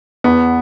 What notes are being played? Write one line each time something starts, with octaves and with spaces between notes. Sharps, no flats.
E2 B3